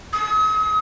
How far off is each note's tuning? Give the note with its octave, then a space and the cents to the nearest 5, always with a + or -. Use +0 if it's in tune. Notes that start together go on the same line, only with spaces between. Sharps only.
D#6 +40